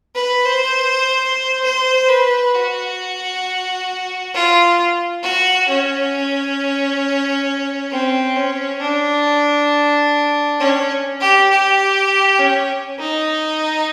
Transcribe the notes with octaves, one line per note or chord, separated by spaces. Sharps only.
B4
C5
C5
B4
F#4
F4
F#4
C#4
C4
C#4
D4
C#4
G4
G4
C#4
D#4